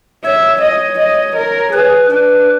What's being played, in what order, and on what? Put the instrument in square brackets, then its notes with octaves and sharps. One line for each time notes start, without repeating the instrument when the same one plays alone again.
[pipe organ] C#5 [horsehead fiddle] E5
[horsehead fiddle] D#5
D#5
A#4
[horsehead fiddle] G#4 [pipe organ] B4
[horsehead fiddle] D4 [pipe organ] B4